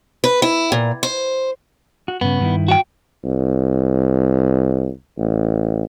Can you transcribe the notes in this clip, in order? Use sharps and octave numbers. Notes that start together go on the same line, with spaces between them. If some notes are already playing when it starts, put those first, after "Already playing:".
B4
E4
A#2
C5
F#4
G2 C#3 B3
G2 D#3 E4
F#4 G5
C2
A1